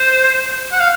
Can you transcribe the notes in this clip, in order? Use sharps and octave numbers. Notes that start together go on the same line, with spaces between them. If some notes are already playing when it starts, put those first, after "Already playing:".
Already playing: C5
F#5
F5